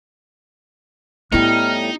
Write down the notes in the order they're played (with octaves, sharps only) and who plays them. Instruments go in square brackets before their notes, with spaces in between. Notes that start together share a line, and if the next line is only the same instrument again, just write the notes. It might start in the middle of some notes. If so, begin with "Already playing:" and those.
[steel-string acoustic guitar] A2 G3 [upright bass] B3 E4 [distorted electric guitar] D#4 [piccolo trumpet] F6